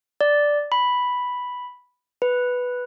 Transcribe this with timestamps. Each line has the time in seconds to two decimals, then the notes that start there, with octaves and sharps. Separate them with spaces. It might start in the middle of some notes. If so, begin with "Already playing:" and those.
0.21 D5
0.72 B5
2.22 B4